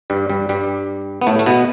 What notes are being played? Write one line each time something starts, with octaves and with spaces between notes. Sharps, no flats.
G2 G3
G2 G3
G2 G3
B3
A2 A3
A3
B2 B3